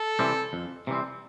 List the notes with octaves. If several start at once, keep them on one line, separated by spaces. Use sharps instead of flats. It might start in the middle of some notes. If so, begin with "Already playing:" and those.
Already playing: A4
C3 E3 G3 C4
F2
C3 E3 G3 C4